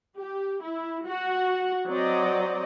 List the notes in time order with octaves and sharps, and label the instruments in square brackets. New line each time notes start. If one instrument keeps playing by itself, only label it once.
[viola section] G4
E4
F#4 F#5
F#3 C4 D5 D#5